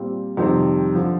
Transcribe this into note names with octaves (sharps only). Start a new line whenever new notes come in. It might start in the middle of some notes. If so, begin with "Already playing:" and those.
Already playing: A#2 G3 C4 F4
F2 C3 D#3 G3 C4
D3 F3